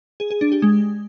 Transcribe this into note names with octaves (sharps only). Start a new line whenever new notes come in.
G#4
G#4
D4
G4
G#3